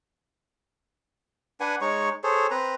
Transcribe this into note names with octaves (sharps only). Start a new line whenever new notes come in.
D4 B4 F#5 G#5
G#3 D#4 C#5 C#6
G#4 A4 C5 C#5
C4 B4 A#5